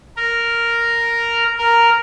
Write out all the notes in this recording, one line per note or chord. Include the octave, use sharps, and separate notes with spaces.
A#4
A#4